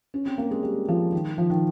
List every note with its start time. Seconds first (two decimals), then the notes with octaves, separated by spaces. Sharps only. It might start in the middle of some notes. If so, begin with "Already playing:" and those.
0.14 C#4
0.26 C4
0.38 A#3
0.51 G#3
0.63 G3
0.88 F3
1.12 D#3
1.38 F3
1.50 D#3